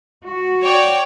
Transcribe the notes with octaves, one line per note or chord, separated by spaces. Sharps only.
F#4
C#5 D5 G5